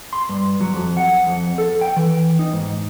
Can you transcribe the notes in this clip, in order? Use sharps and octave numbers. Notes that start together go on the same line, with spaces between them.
C6
G2
F#3
F2
F#5
F2
A4
G5
E3
D#4
G#2